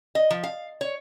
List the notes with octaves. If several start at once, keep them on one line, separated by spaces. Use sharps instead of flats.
D#5
F3
F5
C#5